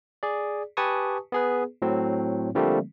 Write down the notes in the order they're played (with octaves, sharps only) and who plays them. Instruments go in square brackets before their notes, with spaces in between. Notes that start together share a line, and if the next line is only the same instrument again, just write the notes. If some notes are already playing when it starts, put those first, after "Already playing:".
[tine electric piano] G#4 D5
G4 B4 G#5 A5 C#6 D#6
B3 G#4 B4
A2 F#3 C4
D3 F3 G3 A3 A#3 C4